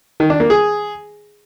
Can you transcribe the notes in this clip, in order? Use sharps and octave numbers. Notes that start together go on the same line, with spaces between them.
D#3
D4
A#3
G#4